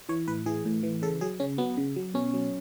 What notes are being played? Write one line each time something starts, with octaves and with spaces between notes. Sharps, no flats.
E3 C#5
A2 B4
E3 G#4
A2
E3
C#3 A4
F#3 G#4
C#3 C#4
F#3 B3
C#3
F#3
B2 C#4
F#3